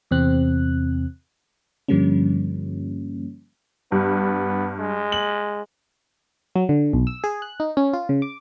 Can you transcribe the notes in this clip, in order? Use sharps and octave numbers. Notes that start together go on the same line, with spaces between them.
E2 C3 C4 F#6
G2 D3 F3 G3 A#3 C#4
G2 B3
G#3
F#7
F#3
D3
B1
E6
G#4
F#6
D#4
C#4
F4
C#3
D6